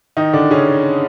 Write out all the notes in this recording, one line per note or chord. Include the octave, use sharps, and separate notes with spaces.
D#3 D#4
D3 D4
C#3 C#4